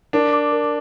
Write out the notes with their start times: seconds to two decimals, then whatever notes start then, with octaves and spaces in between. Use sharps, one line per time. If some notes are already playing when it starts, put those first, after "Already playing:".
0.13 D4 A#4
0.33 D6
0.52 A#4